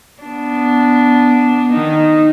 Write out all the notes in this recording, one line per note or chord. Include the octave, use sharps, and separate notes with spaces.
B3 D4
D#3 D#4